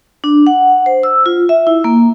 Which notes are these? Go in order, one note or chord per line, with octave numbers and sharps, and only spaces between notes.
D4
F#5
C5
E6
F4
E5
E4
A#3